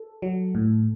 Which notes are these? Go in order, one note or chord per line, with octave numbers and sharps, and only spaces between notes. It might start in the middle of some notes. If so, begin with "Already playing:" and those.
Already playing: A4
F#3
A2